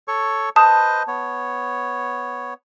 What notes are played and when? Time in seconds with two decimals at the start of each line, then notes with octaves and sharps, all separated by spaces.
0.08 A4 C#5 C#6
0.56 B4 C5 D#5 A5 D#6
1.08 B3 C#5